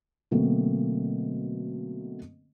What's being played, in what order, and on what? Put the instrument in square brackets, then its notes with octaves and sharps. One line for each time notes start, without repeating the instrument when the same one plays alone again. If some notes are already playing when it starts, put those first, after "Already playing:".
[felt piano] B2 D3 F#3 A3 A#3 C4